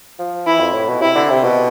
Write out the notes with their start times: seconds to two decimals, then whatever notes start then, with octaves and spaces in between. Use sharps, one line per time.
0.19 F3
0.46 E3 E4
0.61 F2
0.74 A2
0.88 B2
1.02 C3 E4
1.15 D3
1.30 C3
1.44 B2